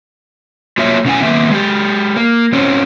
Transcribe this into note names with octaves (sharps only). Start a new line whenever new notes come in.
F#3 A#3 F4 C#5 E5
B2 C#4 E4 F#5 G#5
D#3 A#3 B3 E5
G#3 G4
A#3
F3 C4 C#4